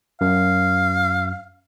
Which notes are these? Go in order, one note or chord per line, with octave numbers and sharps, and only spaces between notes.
F#2 F5